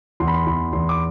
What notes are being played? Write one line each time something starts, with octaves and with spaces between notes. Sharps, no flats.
E2 C6
B5
C6
E2 B5
E2 C6
D6